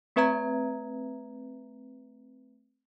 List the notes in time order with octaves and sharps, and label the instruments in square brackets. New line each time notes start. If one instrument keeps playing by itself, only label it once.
[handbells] A3 C4 B4 E5 A#5 G#6